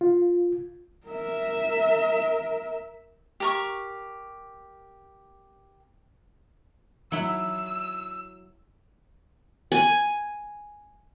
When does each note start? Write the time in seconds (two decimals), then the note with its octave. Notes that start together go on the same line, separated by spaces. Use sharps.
0.01 F4
1.07 A#4 E5
3.40 G4 A#4 C#6
7.12 F#3 E4 E6
9.72 G#5